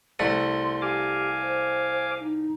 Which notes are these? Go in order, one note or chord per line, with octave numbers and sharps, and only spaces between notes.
C2 A3 F#5 C6
G4 F5 G#5 D6
C5
D#4